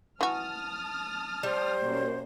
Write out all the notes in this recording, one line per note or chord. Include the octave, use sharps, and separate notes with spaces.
E3 F#4 A5 D#6 F6
G3 C5
F#2 B2 A#3